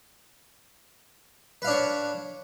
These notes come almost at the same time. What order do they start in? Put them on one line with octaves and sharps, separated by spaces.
B4 F5 D4 C#5